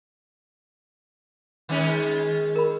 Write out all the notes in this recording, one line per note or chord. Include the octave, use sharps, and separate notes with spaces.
D#3 G#3 C#4
A#4 B5